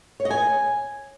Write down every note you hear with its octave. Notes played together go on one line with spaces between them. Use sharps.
C#5
D#5
G#5